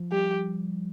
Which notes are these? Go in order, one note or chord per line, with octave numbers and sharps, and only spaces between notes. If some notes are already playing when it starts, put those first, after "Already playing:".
Already playing: F3
G3 G4